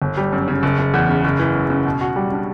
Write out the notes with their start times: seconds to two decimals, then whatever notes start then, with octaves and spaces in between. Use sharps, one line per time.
0.02 G1
0.17 G3
0.32 F#2
0.48 C#3
0.63 F#1
0.79 F#1
0.94 E2
1.09 C#3
1.24 F#1
1.40 E3
1.55 F#2
1.70 C#3
1.85 B2
2.01 F#4
2.16 G3
2.32 D4